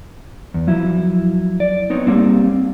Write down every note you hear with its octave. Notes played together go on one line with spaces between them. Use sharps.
E2
F3 F#3 E4
D5
B3 C4 D#4 C#5
G3 A#3 C4